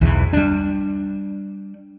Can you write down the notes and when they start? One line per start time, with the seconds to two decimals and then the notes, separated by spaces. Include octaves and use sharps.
0.01 B1 E2 E3
0.33 G3 D4